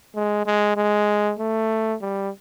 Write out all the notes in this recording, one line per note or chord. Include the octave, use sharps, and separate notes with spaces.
G#3
G#3
G#3
A3
G3